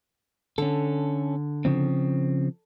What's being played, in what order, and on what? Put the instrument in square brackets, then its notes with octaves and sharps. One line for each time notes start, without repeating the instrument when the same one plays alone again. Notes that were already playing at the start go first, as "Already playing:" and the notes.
[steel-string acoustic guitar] D3 [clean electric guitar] C#4 A4
[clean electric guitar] C#3 F3 C4